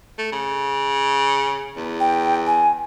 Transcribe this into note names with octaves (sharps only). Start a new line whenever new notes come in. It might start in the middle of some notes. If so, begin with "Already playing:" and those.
A3
C#3
E2
G5
G#5